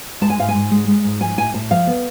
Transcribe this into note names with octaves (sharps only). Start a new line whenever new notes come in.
G#3 A5
G#5
G#2 F5
G#5
G#2
G#3
G#3
G#2
F3 G#5
A2 G#5
A2 A5
F3 F5
B3